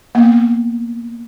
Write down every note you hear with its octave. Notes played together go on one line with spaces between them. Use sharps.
A#3 B3